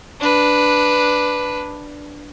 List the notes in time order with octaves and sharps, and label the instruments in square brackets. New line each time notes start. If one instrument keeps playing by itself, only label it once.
[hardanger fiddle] D4 B4